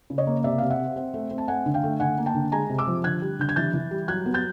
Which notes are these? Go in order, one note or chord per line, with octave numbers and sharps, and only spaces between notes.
C#3
C#5 D#5
A#3
C3 D5 E5
C3 F5
E5 F#5
C4
C4
A3
C4
A5
A3 F#5 G#5
D3
F5 G5
A3
D3 F#5 G#5
A#3
G5 A5
D3
G#3 G#5 A#5
C3
D6 E6
F3
D3 F#6 G#6
G3
D3 G6
G#6
E3 G6 A6
E3
G3
F#3 F#6 G#6
B3
G6 A6